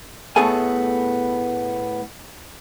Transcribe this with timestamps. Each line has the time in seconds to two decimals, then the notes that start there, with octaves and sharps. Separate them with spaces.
0.36 A2 A3 B3 G#4 A4 G#5